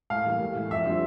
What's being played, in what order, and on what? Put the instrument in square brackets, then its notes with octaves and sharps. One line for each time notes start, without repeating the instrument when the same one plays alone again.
[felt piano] A2 [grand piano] F5
[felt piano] E3 G3 A#3
A2
E3 A3
[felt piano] F2 [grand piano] E5
[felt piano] D3 G3 C4 F4